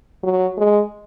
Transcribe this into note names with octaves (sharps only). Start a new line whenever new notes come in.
F#3
G#3